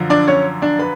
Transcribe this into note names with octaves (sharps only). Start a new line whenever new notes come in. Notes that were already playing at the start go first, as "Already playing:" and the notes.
Already playing: F#2 D3 F3
D4 D5
C#4 C#5
D4 D5
B4 B5